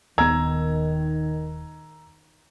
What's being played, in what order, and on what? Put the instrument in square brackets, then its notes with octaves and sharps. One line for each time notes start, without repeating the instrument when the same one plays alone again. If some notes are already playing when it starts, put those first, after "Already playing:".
[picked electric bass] D#1 B3 [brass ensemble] D#3 [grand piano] A#5 E6 G#6